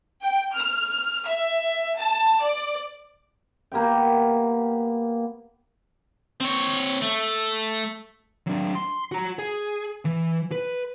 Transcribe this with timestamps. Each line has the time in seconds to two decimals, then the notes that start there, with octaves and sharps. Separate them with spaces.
0.22 G5
0.54 F6
1.26 E5
1.97 A5
2.41 D5
3.72 A#3 B3 G4 G5
6.40 C4 C#5
7.02 A3
8.47 F#3 D4
8.75 C6
9.12 F#4 A#5
9.39 G#4
10.05 E3
10.52 B4